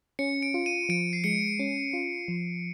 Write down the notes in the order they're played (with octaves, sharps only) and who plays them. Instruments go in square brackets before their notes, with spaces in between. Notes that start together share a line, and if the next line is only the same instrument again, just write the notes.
[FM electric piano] C#4 [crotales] C#7
[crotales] D7
[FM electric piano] F4
[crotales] D#7
[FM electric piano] F3 [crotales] D7
[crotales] C7
[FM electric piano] G#3 [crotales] C#7
[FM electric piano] C#4
F4
F3